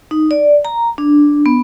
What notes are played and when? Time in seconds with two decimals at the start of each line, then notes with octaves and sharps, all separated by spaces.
0.11 D#4
0.31 D5
0.65 A#5
0.98 D4
1.46 B3